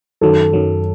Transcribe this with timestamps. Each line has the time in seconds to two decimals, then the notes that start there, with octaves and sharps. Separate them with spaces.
0.21 F#2 D#3 F#3 A4
0.53 F#2 D#3 F#3